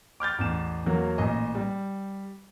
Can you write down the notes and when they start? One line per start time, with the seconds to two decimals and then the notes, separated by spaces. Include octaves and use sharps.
0.20 D6 F6 G6 A6
0.38 A1 E2 E7
0.86 E2 F#3 A#3
1.18 A1 A#2 D#5 G#5
1.55 G3